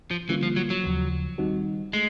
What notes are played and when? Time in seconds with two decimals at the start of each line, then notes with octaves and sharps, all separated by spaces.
0.11 F3
0.29 D3 E3 G3 A#3 C#4 F4
0.43 F3
0.56 F#3
0.70 F#3
0.84 D#2 C#3 F3
1.38 D#3 G3 C4 D#4 F#4
1.93 G#3 A3